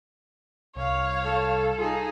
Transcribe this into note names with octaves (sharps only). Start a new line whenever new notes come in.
C2 C#5 F5
A4
D#4 F4 G#4